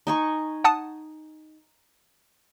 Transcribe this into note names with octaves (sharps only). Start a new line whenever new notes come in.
D#4 G#5 C#6
F#5 A5 D#6